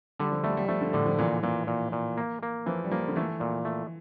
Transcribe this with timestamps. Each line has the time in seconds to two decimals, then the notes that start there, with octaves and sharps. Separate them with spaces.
0.19 D3 G3
0.32 F3
0.44 G3 A3
0.57 G3
0.68 F3 A3
0.81 D3
0.93 A2 D3
1.06 F3
1.19 A#2 E3
1.43 A#2 E3
1.67 A#2
1.92 A#2
2.17 A#3
2.43 A#3
2.66 E3 F3
2.84 G3
2.91 F3 A#3
3.08 D3
3.16 E3 A3
3.40 A#2
3.65 A3